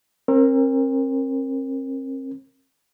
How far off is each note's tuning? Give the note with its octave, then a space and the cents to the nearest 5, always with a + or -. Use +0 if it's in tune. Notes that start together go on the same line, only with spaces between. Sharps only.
C4 +40 A#4 +0